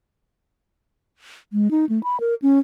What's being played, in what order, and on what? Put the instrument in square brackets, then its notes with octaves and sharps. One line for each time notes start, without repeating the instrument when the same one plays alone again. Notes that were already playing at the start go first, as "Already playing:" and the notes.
[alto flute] G#3
D#4
A3
B5
A#4
C#4